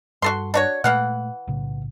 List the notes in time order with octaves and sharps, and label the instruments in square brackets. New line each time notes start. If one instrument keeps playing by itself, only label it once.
[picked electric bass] G2 [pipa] F#4 A4 C6
[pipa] D4 F#4 C#5
[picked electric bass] A#2 G#3 A3 [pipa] E3 F5 F#5
[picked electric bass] B1 A2 C#3